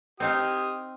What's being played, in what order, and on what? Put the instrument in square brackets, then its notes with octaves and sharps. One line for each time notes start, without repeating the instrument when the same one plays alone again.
[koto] C4 D#4 F5 [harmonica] G4 D#6